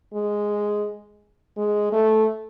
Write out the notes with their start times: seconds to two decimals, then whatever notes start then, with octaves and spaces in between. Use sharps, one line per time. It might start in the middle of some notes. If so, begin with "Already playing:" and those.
0.14 G#3
1.57 G#3
1.92 A3